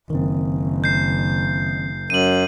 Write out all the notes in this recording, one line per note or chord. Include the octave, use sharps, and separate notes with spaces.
F#1 D#3 C4
G6 C7
F#2 D#7 F#7